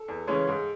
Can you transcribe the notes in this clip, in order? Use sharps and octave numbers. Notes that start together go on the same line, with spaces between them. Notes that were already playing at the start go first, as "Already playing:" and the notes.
Already playing: A4
E2
C#3 E3 G#3 C#4
G#2